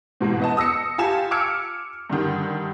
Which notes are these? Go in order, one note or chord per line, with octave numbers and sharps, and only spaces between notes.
G#2 B2 E3 G#3
B3 D#5 A5
D#6 E6 A#6 C#7
F4 G4 G#5 A5 E7
D6 E6 F6 G#6 C#7 D7
G2 D3 D#3 G3